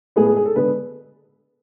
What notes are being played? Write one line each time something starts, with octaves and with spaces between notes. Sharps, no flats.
A2 G#3 B3 G#4
G#4
G#4
A4
D3 G#3 B3 B4